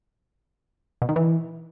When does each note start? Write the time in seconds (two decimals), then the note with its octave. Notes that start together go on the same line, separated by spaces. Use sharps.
1.02 B2
1.09 D#3
1.16 E3